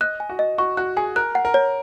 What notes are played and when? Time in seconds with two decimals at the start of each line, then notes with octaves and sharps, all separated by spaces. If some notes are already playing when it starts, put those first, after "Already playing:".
0.01 D#5 F#6
0.20 G#5
0.30 F#4
0.39 D#5
0.58 F#4 C#6
0.77 F#4 F#6
0.97 G#4 G#5
1.16 A#4 F#6
1.35 F#5
1.45 A#4
1.54 C#5